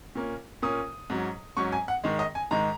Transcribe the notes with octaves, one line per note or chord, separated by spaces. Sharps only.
A#2 A#3 C#4
A#2 A#3 C#4 D#6
G#2 F#3 C#4
G#2 F#3 C#4 C#6
G#5
F#5
G#2 D#3 G#3
D#5
G#5
G#2 D#3 G#3 A#5